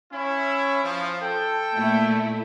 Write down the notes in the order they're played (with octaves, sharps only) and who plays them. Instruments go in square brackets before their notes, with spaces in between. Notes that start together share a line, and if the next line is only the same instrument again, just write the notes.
[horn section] C#4 E4
F3
A4 G5
[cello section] A#2 A3 E4